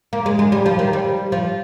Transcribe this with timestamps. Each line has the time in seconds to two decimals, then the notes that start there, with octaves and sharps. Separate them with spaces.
0.13 A#3
0.26 G#3
0.39 G#3
0.52 G3
0.66 F3
0.79 D#3
0.93 G3
1.32 F3